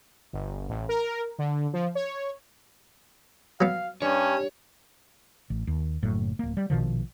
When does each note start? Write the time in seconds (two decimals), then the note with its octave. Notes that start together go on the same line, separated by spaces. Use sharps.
0.33 G1
0.69 A1
0.89 A#4
1.39 D3
1.73 F3
1.95 C#5
3.61 F#3 B3 F5
4.02 G2 C#4 C#5
5.50 A1
5.67 D#2
6.03 F#1 A2 F#3
6.39 D1 A#3
6.57 G3
6.70 A#1 B2 D#3 F3